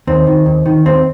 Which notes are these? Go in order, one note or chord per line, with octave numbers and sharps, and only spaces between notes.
D#2 C4
D#3
D#2
D#3
D#2 C4